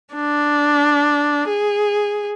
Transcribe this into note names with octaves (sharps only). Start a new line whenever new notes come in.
D4
G#4